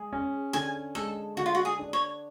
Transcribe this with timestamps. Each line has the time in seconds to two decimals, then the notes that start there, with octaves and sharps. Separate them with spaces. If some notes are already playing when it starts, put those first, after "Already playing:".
Already playing: G#3 G#4
0.13 C#4
0.53 D3 G#5
0.95 G#3 A4
1.37 D3 F#4
1.46 F4
1.55 F#4
1.65 G#4
1.79 D4
1.93 C#5